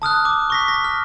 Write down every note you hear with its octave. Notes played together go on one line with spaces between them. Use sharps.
A5 D#6 F6 F#6
D6
C#6 A#6 B6
A#6
F6